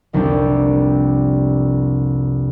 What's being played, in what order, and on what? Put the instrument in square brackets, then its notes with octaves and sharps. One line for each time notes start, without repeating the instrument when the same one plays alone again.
[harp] F1 C2 F2 F3 D4 G4